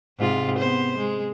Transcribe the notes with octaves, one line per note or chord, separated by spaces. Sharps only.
G#2 C3 F4
B3 C5
G#3